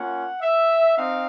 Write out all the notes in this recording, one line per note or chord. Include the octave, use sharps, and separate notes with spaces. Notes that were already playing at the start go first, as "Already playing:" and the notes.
Already playing: A#3 C#4 F4 F#5
E5
C4 D#4 F5